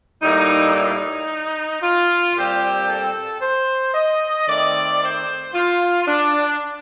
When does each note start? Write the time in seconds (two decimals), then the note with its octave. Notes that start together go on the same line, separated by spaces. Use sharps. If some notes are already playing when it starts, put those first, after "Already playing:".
0.22 A2 G3 A#3 D#4
0.76 D#4
1.82 F4
2.35 A#2 G3 C4 G4
2.88 A4
3.41 C5
3.94 D#5
4.47 D#3 A3 C4 D5
5.01 C5
5.54 F4
6.07 D4